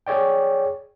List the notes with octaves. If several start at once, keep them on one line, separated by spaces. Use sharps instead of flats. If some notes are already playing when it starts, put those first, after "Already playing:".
G#4 C#5 D5 G5